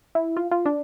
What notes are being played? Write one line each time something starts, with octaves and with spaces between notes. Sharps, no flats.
E4
F4
F4
D4